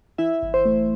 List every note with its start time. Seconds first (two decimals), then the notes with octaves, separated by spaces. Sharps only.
0.18 E3 E4 E5
0.43 G1
0.54 C5
0.65 A3